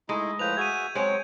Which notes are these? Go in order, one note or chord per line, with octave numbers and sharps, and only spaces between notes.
G#3 A3 D#4 E4
A2 F3 B4 G6 F7
F#4 G#4 E5 G#6 D#7
F#3 G#3 C4 C#5